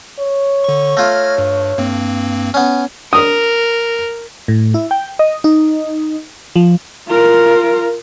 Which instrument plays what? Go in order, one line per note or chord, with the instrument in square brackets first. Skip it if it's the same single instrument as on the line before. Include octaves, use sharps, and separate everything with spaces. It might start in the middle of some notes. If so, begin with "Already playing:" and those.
[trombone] C#5
[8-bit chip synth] D3 C#6
[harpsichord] A3 F4 [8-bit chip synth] F6 G#6 A#6
[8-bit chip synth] G2
G2 A#3 C4
[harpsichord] B3 C#4
[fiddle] A#4 [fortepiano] D#6
[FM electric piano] A2
E4
G5
D#5
D#4
F3
[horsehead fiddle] F4 A#4